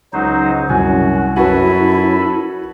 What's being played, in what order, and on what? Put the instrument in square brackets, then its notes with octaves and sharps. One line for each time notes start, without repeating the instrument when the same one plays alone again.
[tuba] C#2 [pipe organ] F#3 D#4 C5
[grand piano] C2 G#5 [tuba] F#2 [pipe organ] F#4
[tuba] F#2 [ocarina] E4 [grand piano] F#4 B4 [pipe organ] A4 G#5 B5